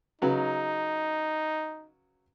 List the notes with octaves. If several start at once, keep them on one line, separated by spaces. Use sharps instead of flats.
C#3 F#3 D#4 B4